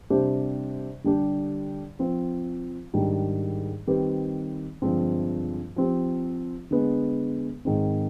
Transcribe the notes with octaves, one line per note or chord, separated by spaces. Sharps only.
C3 G3 D4 G4 C5
D3 G3 D4 G4
F3 C4 F4
G#2 D#3 G3 D4
D#3 G3 C4 G4 B4
G2 D3 F3 G#3 C4
F3 C4 G4
D3 G#3 B3
G#2 D#3 G#3 C4